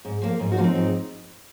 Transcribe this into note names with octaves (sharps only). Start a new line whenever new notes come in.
G#2
F3 A#3
G#2
D#4 F#4
F3 A#3
C4 D#4
G#2